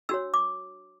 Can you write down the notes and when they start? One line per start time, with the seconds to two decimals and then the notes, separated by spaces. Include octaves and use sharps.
0.09 D4 F#4 C#5 E6
0.34 D6